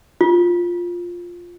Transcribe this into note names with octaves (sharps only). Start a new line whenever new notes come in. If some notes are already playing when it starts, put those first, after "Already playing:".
F4